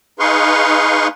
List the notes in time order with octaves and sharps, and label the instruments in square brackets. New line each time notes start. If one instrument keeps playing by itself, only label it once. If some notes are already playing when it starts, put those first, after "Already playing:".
[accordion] D#4 G#4 B4 F5 C6 C#6